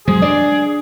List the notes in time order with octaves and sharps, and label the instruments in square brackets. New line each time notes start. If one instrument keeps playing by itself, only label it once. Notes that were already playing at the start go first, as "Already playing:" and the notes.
[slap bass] F#3 G#3 [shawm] G#4 [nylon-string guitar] C5
[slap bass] D4 [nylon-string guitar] D5